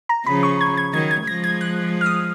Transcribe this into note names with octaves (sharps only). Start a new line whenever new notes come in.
A#5
C#3 F3 B5
C#6
G#6
G#6
D#3 F#3 G#6
G#6
F3 G#3 A#6
G#6
F#6
F6
D#6